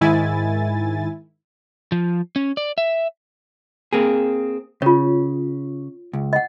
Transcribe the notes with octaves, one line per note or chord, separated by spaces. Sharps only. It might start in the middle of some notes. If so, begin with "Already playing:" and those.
G#2 D#3 E4 G#5 A6
F3
C#4
D5
E5
A#3 C4 G#4
C#3 F4 C#5
C#2
D#5 F#5